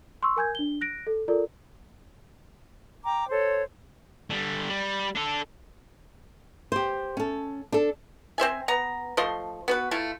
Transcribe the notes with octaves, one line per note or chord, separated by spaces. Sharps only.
C6 C#6 E6
A#4 G#5 G6 G#6
D4 G7
F#6 A#6 D7
A4
F4 A4 A#4 D5
G5 A#5 D6
A4 C5 C#5
D3 G3
G3
D4 A4
G4 C5
C#4 A4
D4 A4
C4 C5 E5 G#5
B3 A#5
F3 A3 D#5 C6
B3 F#4 B4
A3 E4 F4